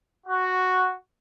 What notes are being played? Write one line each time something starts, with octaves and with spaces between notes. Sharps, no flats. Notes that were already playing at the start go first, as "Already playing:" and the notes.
F#4